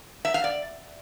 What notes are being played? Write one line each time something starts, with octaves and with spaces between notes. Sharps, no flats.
E5
F5
D5